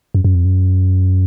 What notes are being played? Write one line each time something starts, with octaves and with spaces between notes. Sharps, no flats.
F#2
F#2
F2
F#2